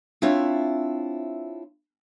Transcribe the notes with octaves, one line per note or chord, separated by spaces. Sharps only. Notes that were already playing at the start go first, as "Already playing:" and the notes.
C4 D4 E4 F4 C#5 E5